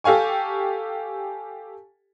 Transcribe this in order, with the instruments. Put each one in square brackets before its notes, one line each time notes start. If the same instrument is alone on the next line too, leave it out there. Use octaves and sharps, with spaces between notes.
[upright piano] G4 A4 F5 G#5 C#6